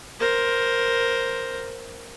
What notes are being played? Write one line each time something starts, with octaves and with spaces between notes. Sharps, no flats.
A#4 C5